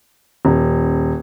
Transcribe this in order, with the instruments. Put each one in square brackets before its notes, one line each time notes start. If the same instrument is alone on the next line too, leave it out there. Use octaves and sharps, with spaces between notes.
[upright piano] D#1